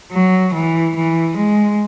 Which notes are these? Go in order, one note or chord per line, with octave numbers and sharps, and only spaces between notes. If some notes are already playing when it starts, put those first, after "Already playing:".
F#3
E3
E3
G#3